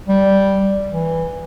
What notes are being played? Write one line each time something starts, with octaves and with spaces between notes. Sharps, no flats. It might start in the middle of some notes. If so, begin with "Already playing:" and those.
G3
E3